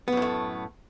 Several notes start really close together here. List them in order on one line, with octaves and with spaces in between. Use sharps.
B3 F#2 A2 A3